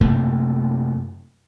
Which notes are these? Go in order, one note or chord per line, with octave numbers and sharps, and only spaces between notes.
F#2 C3 A3 A#3